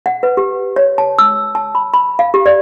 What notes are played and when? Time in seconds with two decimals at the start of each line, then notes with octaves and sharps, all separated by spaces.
0.06 F#5
0.23 B4
0.37 G4
0.76 C#5
0.98 A5
1.19 E6
1.55 A5
1.75 B5
1.94 B5
2.19 F5
2.34 G4
2.46 D5